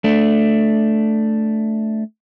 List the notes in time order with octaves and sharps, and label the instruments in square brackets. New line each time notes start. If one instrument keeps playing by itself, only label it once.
[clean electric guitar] A3 D4